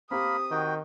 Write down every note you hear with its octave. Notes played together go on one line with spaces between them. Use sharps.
A#3 C4 G4 A#4 B5 D#6
D#3 F#4 G5